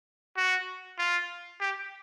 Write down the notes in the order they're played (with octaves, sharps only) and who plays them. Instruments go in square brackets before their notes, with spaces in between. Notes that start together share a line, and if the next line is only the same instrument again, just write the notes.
[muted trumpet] F#4
F4
G4